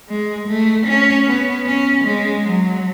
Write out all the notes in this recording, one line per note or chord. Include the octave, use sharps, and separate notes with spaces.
G#3
A3
C#4
B3
C#4
G#3
F#3